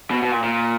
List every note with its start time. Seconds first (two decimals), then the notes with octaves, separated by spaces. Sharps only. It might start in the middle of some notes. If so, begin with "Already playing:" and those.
0.11 B2
0.22 B2
0.32 A#2
0.43 A#2